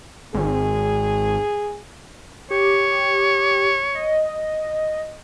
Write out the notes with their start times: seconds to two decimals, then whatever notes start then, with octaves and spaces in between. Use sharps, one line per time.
0.34 G#1 G#4
2.51 G4 C#5
3.95 D#5